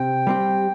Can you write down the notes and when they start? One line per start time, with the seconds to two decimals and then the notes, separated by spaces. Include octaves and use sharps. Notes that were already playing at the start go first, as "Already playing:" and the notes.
Already playing: C3 G5
0.27 G3 C4 G4